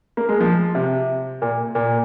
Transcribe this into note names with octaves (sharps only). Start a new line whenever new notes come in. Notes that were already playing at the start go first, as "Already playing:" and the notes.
A#3
G#3
F3
C3
A#2
A#2